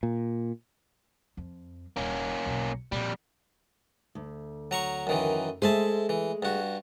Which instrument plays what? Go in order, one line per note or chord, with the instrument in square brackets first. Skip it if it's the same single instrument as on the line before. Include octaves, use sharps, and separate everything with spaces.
[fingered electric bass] A#2
[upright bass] F2
[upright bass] D#1 [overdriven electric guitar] A#3 C#4
[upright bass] B1 E2
[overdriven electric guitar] F2 G3 [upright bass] A#2
[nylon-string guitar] D2
[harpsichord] F#3 A#5 C#6
F#2 D#3 E3
[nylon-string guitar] G#3 A3 G#4 [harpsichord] C5 E5 A5
[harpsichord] E3
G2 F#4